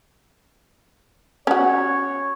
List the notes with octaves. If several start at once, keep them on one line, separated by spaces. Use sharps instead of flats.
C#4 F#4 C#5